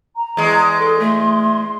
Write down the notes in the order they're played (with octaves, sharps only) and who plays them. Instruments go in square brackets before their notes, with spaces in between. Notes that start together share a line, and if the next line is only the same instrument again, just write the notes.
[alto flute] A#5
[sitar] E2 G#3
[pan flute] A4 [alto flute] C6
[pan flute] A3